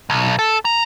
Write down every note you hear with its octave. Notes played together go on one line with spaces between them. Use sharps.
B1
A4
A#5